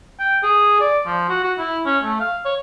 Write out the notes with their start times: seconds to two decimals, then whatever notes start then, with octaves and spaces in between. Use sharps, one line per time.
0.20 G5
0.43 G#4
0.81 D5
1.06 F3
1.30 F#4
1.43 F#4
1.58 E4
1.85 C#4
2.03 A3
2.20 F5
2.45 C#5